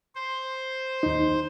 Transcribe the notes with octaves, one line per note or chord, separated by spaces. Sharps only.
C5
D#2 D#4